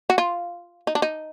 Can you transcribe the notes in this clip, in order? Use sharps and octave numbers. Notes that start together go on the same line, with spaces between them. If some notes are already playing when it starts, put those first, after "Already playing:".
F#4
F4
D#4
D4
D#4